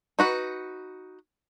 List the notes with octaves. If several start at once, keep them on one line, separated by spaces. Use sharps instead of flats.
D#4 F#4 B4